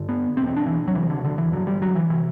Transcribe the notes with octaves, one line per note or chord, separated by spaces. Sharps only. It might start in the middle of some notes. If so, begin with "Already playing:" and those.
Already playing: G2 D3
B3
E2 B2 C4
C4
D4
E3
F#3
E2 C3 E3
D3
D3
E3
G2 D3 F#3
G3
F#3
E3
C3 E3